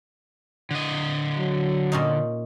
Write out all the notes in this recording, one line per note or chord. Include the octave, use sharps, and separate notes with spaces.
D3 D#5
F#3
A#2 C#4 D#4